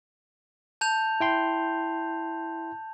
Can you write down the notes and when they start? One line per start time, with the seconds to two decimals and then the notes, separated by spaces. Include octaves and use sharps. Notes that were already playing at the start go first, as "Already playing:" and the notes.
0.81 A5 G6 F7
1.20 E4 G5 C6